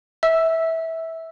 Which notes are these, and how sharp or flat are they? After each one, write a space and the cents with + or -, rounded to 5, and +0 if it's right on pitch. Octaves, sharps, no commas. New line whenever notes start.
E5 -20 E6 +5